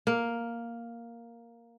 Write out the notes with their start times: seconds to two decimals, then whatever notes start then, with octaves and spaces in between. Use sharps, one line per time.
0.07 A#3